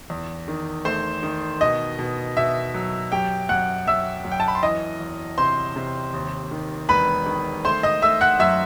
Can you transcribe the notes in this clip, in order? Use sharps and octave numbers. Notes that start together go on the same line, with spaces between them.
E2
D#3
A3 C5 C6
D#3
B2 D#5
B2
B2 E5
F#3
F#2 G4 G5
F#2 F#5 F#6
F#2 E5 E6
F#2
G5
A5
B5
C6
E3 D#5 D#6
E2
C3 C5 C6
C3
D#2
D#3
E1 B4 B5
D#3
A3 C5 C6
D#5 D#6
A3 E5 E6
F#5 F#6
F#2 E5 E6